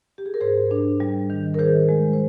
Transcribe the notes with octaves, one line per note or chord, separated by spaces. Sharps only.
G4
G#4
A#4
G#2 G#4 C5
D4
G3
D#3
A#4
D#3 G#4 C5
G#3
C5